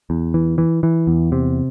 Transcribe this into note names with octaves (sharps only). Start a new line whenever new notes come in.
E2
E3
E3
E3
E2
C3